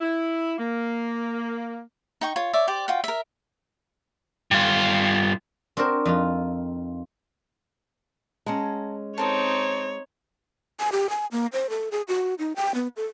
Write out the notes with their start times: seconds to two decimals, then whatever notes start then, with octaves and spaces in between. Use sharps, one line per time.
0.01 E4
0.58 A#3
2.21 D#4 G5 C#6
2.36 F4 C#5
2.53 C#5 D5 E5
2.68 G4 C5 D5
2.88 F4 F#4 G5
3.04 A#4 E5
4.51 G2 F4
5.77 C4 D4 F#4 A#4 C5
6.05 F2 D#4 F4
8.46 G#3 C#4 F#5 A5 A#5
9.18 C4 D#4 A4 A#4 C#5 D#6
10.80 G#5
10.92 G4
11.09 G#5
11.32 A#3
11.53 C5
11.70 A4
11.92 G#4
12.08 F#4
12.39 D#4
12.56 G5
12.74 B3
12.96 A4